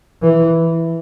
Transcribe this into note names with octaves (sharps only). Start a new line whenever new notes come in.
E3